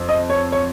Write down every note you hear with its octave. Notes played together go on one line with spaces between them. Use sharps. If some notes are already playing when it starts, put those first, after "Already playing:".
Already playing: F2
D#5
C#5
C#5